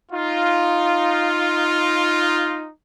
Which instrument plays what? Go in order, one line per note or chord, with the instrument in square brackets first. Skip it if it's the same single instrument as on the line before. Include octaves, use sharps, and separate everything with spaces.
[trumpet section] D#4 F4